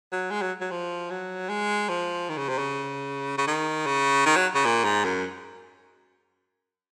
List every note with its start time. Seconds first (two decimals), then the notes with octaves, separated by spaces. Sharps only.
0.12 F#3
0.31 G#3
0.42 F#3
0.61 F#3
0.71 F3
1.10 F#3
1.49 G#3
1.89 F3
2.29 D#3
2.38 C#3
2.49 C3
2.58 C#3
3.38 C#3
3.47 D#3
3.86 C#3
4.26 D#3
4.36 F#3
4.55 C#3
4.65 A#2
4.84 G#2
5.04 F#2